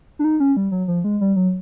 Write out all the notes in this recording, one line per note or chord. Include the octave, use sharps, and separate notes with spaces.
D4
D#4
C#4
G3
F#3
F3
G#3
G3
F#3